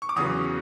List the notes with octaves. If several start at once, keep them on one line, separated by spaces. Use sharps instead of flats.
C#6
D6
E2 C#3 F#3 C#6 D#6